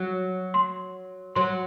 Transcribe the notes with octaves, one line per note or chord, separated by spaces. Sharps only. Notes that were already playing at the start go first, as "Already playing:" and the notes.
Already playing: F#3
C6
F#3 C6